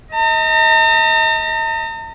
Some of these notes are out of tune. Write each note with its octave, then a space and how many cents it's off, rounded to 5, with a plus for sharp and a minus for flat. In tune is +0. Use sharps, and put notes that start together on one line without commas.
D#5 +30 A#5 -45